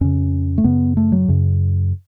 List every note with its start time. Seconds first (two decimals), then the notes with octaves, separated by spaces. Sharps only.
0.01 F2 C#3 C#4
0.58 A3
0.64 F#2 C#3 B3
0.97 A3
1.12 F#3
1.28 F#2 C#3